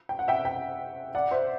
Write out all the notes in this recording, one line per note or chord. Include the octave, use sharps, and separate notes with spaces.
G5
F#5
E5 G5
E5 G5
D5 F#5
C5 E5